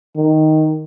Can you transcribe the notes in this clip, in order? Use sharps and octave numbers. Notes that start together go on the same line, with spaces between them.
D#3